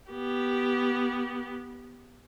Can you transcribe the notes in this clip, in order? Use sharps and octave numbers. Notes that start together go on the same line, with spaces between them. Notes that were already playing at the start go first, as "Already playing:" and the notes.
B3 G4